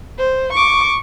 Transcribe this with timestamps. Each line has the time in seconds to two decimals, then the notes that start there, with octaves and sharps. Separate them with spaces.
0.19 C5
0.53 C#6 D6